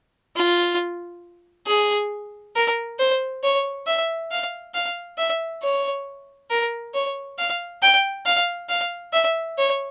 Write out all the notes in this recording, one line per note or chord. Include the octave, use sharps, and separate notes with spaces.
F4
G#4
A#4
C5
C#5
E5
F5
F5
E5
C#5
A#4
C#5
F5
G5
F5
F5
E5
C#5